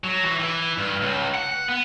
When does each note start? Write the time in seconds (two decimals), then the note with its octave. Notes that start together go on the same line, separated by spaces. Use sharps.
0.04 F#3
0.25 E3
0.40 E3
0.78 G2
1.01 C#2
1.34 F#5
1.69 B3